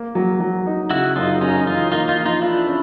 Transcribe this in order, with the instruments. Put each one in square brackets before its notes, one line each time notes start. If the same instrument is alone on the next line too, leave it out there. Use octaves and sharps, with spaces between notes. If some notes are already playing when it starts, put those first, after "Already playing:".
Already playing: [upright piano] A#3
F#3
F#3
D#4
[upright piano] C#3 [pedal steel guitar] E4 F#4
[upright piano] F#2 [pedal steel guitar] D#4 F4
[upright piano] F#2 [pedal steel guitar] C#4 D#4
[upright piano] E3 [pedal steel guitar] D#4 F4
[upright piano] A#3 [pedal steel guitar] D#4 F4
[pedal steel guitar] D#4 F4
[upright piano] F3
[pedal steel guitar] D#4 F4
[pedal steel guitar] D4 E4 [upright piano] F4
[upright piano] C#4